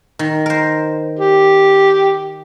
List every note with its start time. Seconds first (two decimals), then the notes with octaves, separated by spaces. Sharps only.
0.19 D#3
0.46 A#4 C5
1.19 G4